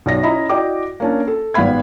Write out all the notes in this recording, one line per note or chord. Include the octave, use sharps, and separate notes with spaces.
B1 D5 A#6
C#4 E4 D#5 E5 A#5 B5
E4 F#4 D5 D#5 G5 D6
A#3 C#4 D4
A4
G#1 G3 B3 F5 B5 G#6